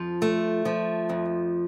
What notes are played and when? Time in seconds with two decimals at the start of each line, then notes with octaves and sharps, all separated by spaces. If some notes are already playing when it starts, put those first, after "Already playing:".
Already playing: F2 F3
0.22 A3
0.65 F3
1.09 F2